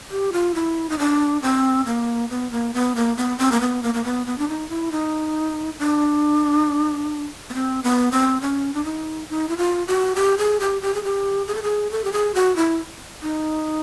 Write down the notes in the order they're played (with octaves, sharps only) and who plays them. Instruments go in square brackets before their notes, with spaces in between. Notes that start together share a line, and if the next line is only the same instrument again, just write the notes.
[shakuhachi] G4
F4
E4
D#4
D4
C4
A#3
B3
A#3
B3
A#3
B3
C4
A#3
B3
A#3
A#3
B3
B3
D4
D#4
E4
D#4
D4
B3
C4
B3
C4
C#4
D4
D#4
D#4
E4
F4
F#4
G4
G#4
G4
G4
G#4
G4
G#4
A4
G#4
A4
G4
G#4
F#4
E4
D#4